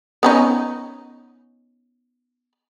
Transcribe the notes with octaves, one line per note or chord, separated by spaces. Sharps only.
B3 C#4 D#4